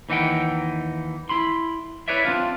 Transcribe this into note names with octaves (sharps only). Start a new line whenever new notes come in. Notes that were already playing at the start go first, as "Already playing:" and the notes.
D#2 E3 D#4 F#5 G5
E4 B5 C6
E4 B4 C#5 D5 E5
C4 D4 F4